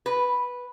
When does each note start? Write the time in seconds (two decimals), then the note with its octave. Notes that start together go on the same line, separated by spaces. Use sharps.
0.06 B4